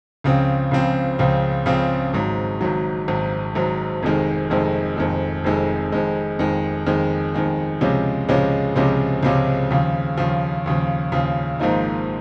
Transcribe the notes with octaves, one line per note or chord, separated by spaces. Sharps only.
C#2 C#3 F3 C4
C#2 C#3 F3 C4
C#2 C#3 F3 C4
C#2 C#3 F3 C4
G#1 G#2 F#3
G#1 G#2 F#3
G#1 G#2 F#3
G#1 G#2 F#3
F1 F2 D#3 G#3
F1 F2 D#3 G#3
F1 F2 D#3 G#3
F1 F2 D#3 G#3
F2 D#3 G#3
F2 D#3 G#3
F2 D#3 G#3
F2 D#3 G#3
C#2 C3 F3 G#3 C#4
C#2 C3 F3 G#3 C#4
C#2 C3 F3 G#3 C#4
C#2 C3 F3 G#3 C#4
D#2 C#3 F3
D#2 C#3 F3
D#2 C#3 F3
D#2 C#3 F3
G#1 G#2 F3 A#3 D#4